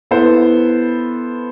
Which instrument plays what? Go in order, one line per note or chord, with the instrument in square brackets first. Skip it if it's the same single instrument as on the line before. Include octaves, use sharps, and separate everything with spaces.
[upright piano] B3 E4 A4 C5